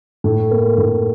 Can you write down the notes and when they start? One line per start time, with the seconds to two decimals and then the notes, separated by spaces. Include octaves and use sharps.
0.24 A2
0.51 A#3
0.78 A2